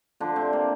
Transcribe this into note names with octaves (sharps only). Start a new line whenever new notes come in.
D3 F3 D4
C4
C3
A#3